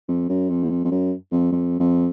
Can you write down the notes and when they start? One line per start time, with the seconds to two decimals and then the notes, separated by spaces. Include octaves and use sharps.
0.08 F2
0.29 F#2
0.50 F2
0.63 E2
0.70 F2
0.85 F2
0.91 F#2
1.32 F2
1.52 F2
1.80 F2